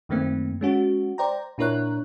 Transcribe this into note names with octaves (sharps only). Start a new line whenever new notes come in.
F#2 D#3 A3 A#3 C4
G#3 C#4 F#4
C5 D5 G5 A#5
A#2 D4 E4 A#4 C#5 F#6